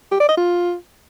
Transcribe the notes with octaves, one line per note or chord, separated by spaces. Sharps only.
G4
D5
D#5
F4